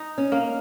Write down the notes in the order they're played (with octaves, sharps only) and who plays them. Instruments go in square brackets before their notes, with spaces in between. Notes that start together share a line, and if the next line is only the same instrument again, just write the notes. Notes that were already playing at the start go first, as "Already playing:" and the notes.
Already playing: [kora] D#4
[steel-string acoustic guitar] C#4
[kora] A#3